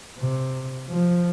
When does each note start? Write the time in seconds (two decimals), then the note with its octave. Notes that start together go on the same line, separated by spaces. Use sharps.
0.19 C3
0.89 F3